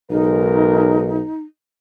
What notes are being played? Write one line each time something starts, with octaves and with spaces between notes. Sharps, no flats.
B1 C#3 G#3 D#4 A#4